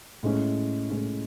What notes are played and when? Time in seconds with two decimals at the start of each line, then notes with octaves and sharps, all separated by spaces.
0.23 A2 G#3 C#4
0.90 A2 G#3 C#4